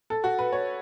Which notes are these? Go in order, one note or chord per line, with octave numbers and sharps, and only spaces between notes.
A4
F#4
B4
C#5